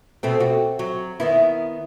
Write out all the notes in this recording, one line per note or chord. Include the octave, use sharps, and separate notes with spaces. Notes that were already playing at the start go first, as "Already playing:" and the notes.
B2 A3 C4
F#4
F#3
D#3 B3 E4